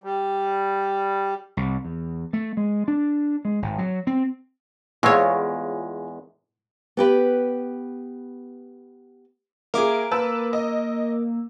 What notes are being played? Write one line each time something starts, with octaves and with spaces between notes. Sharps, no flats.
G3
C2
E2
A3
G#3
D4
G#3
G#1
F#3
C4
E2 G#3 F4 C#5 C#6 E6 G#6
B3 G4 B4
A#3 G#4 A#4 E5 D6
A#3 B4 A5 E6
D#5